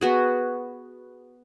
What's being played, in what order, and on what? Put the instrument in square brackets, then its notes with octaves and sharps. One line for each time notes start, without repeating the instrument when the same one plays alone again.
[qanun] B3 F#4 G#4